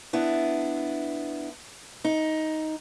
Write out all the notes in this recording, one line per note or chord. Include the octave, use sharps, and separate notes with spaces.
B3 D4 E4
D#4